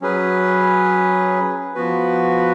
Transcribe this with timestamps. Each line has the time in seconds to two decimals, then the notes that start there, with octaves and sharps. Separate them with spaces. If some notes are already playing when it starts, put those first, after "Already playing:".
0.02 F#3 C#4 G#4 B4
1.74 F3 B3 F#4 B4